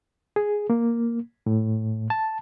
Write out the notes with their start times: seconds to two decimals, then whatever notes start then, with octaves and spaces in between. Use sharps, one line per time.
0.36 G#4
0.70 A#3
1.46 A2
2.10 A5